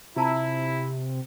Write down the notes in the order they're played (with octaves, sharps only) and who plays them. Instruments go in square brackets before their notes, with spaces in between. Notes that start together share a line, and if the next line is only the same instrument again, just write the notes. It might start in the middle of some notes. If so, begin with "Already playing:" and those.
[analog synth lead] C3 [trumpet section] E4 [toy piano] F4 A5 A#5